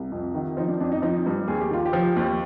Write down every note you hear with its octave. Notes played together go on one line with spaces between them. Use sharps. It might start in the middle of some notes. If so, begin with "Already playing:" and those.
Already playing: C2
F2
D#3
F3 D#4
D4
F2 D4
D#4
F3 D#4
G2
D#2 G#4
G4
D#3 F4
G4
F3
D#2